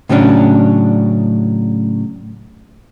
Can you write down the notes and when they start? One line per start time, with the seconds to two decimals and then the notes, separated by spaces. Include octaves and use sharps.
0.09 A2 C#3 F#3 C#4 D4